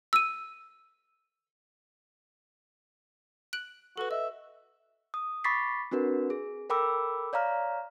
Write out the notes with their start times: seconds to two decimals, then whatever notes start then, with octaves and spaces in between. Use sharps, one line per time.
0.13 E6 D#7
3.53 F#6 D7 F#7
3.97 F#4 A4 B4
4.11 D#5 E5
5.14 D#6
5.44 B5 C#6 D6 A6 B6 C7
5.91 C4 D4 F#4 A#4 B4
6.30 G#4
6.70 A4 A#4 G5 B5 D6 E6
7.33 C#5 D5 F5 A#5 F6